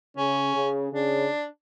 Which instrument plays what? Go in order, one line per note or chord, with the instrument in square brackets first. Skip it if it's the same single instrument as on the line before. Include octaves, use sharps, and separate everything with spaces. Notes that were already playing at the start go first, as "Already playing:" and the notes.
[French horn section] C#3 [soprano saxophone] C#4
[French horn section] C#3
[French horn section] C#3 [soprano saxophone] D4